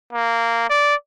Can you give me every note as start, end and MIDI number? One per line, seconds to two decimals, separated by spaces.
0.13 0.69 58
0.70 0.95 74